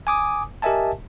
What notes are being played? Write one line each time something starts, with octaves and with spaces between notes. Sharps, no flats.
G#5 D6 D#6
G4 A#4 D#5 E5 G#5 A5